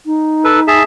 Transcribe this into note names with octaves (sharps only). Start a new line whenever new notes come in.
D#4
A4 B4
G#4 E5 A5